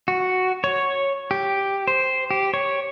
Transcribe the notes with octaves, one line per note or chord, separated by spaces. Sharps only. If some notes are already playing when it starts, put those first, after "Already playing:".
F#4
C#5
G4
C5
G4
C#5